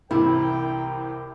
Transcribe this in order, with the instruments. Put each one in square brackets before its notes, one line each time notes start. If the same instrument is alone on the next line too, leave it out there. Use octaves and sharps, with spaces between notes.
[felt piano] C2 C3 E3 [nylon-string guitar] E4 [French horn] A#4 [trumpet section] G5